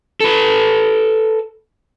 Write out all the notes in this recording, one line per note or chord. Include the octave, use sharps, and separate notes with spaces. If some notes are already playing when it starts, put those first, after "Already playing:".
A4 B4